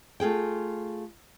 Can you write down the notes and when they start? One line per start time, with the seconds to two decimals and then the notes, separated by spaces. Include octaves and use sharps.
0.20 A3 F4 G#4 G5